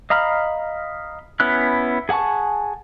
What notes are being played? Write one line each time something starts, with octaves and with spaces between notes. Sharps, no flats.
D#5 F5 A#5 B5 F6
B3 C#4 E4 F#6
G#4 F#5 G#5 A5 C#6